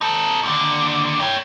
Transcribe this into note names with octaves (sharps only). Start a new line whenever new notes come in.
D#4 A4
D#2 D3
C#5 G5